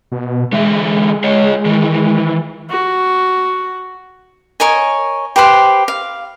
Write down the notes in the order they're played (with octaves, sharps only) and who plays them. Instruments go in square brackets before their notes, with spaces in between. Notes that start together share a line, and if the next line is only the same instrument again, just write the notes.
[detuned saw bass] B2
[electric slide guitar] D3 E3 E5 [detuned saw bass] G#3
[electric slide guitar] G#4 C#5 D#5
D#3 E3
[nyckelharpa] F#4
[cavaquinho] A#4 C#5 D#5 G#5
G4 B4 C5 C6
F5